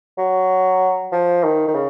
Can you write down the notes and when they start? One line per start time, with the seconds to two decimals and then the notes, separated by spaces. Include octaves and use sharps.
0.18 F#3
1.12 F3
1.44 D#3
1.68 D#3
1.75 C#3